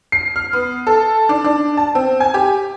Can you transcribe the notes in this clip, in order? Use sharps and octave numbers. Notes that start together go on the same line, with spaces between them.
C7
F6
B3
A4
D4
D4
A5
C4
G#5
G4